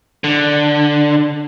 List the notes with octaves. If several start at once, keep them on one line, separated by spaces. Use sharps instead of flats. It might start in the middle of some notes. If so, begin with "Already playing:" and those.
D3